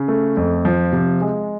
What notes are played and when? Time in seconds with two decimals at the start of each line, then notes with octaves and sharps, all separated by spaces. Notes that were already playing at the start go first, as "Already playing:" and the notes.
Already playing: C#3
0.08 A3
0.37 F2
0.65 F3
0.93 C3
1.21 G#3